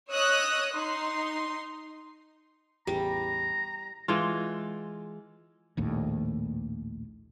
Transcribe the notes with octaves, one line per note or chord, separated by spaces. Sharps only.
C#5 D#5 D#6 E6 F#6
D#4 C6
A1 E2 G3 A#5
E3 G#3 F4
A#1 D#2 A2